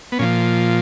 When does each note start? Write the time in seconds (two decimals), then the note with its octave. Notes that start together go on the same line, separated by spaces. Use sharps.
0.12 B3
0.19 A#2 F3 C#4